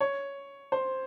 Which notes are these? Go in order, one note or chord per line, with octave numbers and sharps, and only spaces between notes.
C#5
C5